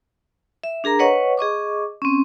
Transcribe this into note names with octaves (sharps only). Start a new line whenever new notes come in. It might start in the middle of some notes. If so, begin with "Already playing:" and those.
E5
D4 G#4 A#4 A#5
B4 C#5 D#5 F#5 C#6
G#4 D#5 C#6 D6
C4 C#4